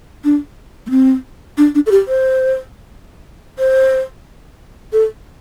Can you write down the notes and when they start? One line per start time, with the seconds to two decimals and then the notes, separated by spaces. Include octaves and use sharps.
0.24 D4
0.86 A3
0.90 C4
1.58 D4
1.75 D4
1.86 A4
1.91 G4
2.08 C5
3.59 C5
4.93 A4